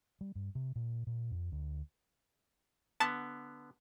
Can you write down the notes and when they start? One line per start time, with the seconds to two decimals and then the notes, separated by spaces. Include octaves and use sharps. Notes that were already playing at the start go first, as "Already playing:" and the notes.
0.21 G3
0.35 G2
0.55 C3
0.76 A#2
1.07 A#2
1.31 F2
1.52 D2
3.00 D3 B3 A5